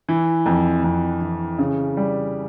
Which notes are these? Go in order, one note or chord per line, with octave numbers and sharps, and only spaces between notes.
E3
F2
F2
E3
C#3
G3